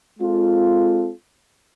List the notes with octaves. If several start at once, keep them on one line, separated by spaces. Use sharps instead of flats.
G#3 C4 F4 A4